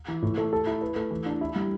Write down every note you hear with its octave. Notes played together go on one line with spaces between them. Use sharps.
E3
A2
A3
A4
E4
B4
A3
E3
D4
E4
G3